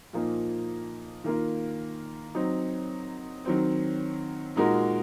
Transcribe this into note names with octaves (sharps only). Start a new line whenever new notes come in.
A#2 F3 A#3 D#4
D#3 A#3 F4 A#4
F#3 C4 D#4
D#3 F#3 C4
A#2 G#3 D#4 F#4 A#4